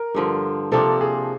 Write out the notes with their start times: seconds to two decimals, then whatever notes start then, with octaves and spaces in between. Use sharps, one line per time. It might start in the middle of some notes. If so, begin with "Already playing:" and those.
Already playing: A#4
0.15 G2 D3 F3
0.72 C3 F3 A#3 D4 A4
1.01 G#4